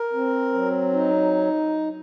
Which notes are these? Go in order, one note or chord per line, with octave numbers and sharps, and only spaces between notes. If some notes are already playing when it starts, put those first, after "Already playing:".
Already playing: A#4
C4
F#3
D#4